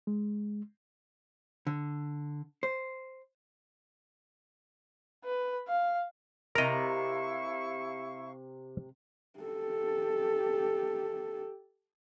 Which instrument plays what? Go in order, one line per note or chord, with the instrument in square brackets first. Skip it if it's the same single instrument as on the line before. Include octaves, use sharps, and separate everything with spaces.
[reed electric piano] G#3
[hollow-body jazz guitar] D3
C5
[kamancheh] B4
F5
[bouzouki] C3 A#5 [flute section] E4 F5 C#6 [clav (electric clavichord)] A#4 D#5
[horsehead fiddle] G4 A4